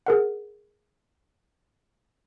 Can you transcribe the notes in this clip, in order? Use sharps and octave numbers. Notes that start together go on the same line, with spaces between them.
G#4 A#4 F#5